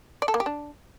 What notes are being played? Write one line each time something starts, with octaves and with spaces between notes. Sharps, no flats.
D5
A4
A#3
G4
D4